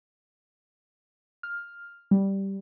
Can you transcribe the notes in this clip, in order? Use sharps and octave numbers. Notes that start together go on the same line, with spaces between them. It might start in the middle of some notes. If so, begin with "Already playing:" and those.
F6
G3